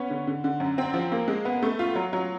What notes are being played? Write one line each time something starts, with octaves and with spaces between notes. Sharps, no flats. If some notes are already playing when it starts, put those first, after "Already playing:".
Already playing: B3 C#4
D3
D3
D3
F#2
C4
F3
A#3
G#3
B3
A3
F4
F#3
F#3